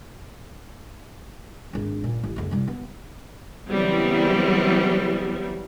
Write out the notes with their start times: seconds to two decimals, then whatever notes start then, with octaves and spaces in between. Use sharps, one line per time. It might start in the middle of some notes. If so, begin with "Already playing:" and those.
1.73 G#1 D4
2.04 A#2
2.24 A1
2.36 F#1 D2
2.51 C2 G3
2.68 B3
3.69 C#3 E3 F#3 G3 B3 C4